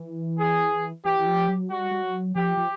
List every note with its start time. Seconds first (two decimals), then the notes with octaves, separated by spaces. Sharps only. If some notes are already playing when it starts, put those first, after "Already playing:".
Already playing: E3
0.39 G#4
1.05 E3 G4
1.19 E3
1.27 F3
1.48 F#3
1.70 G3 F#4
1.91 G3
2.03 F#3
2.35 F3 G4
2.57 F3